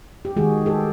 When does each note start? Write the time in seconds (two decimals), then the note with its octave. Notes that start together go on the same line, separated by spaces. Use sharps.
0.25 G4
0.36 D#3 G#3 F#4 G#4
0.66 G4 A4